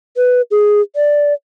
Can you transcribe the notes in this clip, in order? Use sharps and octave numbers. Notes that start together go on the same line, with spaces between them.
B4
G#4
D5